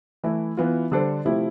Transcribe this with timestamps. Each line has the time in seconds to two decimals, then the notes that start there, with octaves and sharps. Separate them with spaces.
0.24 E3 A3 E4
0.57 E3 B3 F4
0.91 D3 G3 D4 A4 C5
1.25 C3 F3 A3 E4 G4